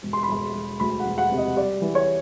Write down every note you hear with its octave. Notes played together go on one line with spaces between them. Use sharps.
E1
C6
B5
E1 C6
E1
D2 B5
F#5
E1
F#5
C3
D#5
G3 D5
E3
C#5